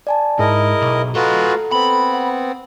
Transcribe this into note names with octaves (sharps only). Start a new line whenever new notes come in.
D5 G#5 A5
G#2 E4 G#4 A#4 D#5
B1
A3 F4 F#4 A4 B4 D#5 A#5
B3 C4 B5
F#5